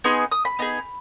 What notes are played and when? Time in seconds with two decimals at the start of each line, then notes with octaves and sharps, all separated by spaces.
0.04 B3 D#4 G#4 C6
0.32 D#6
0.45 B5
0.59 B3 D#4 G#4